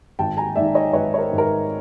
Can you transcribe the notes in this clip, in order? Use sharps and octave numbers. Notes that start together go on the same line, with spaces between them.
G#1 G5 A5
G#5 A#5
G#2 D#3 D5 E5
C#5 D#5
G#1 B4 C#5
C#5
A#4 C5
G#2 D#3
A#4
B4